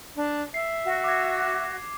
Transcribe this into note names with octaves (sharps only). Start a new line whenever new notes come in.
D4
E5 C7
F#4
D6 G#6